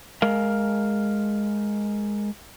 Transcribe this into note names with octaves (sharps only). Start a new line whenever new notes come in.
G#3 A#4 F5